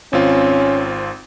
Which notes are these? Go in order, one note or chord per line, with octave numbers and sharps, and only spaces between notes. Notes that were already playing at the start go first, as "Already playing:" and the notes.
G#1 C4 C#4 F4